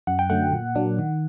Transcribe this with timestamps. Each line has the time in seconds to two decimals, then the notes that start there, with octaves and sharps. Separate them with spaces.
0.07 F#2 F#5
0.19 G5
0.30 D3 F#3 A3 F#5
0.52 A#2
0.75 F#3 A#3 D4
0.99 D#3